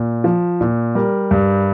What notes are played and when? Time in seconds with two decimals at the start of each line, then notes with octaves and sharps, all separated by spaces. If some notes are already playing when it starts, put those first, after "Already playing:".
Already playing: A#2
0.24 F3
0.61 A#2
0.95 G3 A#4
1.31 G2